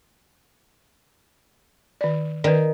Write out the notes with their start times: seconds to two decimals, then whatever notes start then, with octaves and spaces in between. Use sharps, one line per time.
2.01 D#3 D5
2.44 D#3 B4 D5